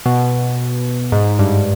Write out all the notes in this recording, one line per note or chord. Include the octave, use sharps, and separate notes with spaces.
B2
G#2
G2